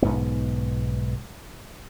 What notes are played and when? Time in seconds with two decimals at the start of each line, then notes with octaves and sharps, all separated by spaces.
0.02 B1 G#2 B3